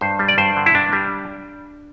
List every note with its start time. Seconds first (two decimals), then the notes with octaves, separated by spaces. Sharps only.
0.01 G2 C5
0.19 G3
0.28 D5
0.38 G2 C5
0.57 D3
0.66 E4
0.75 G2 D4
0.93 G3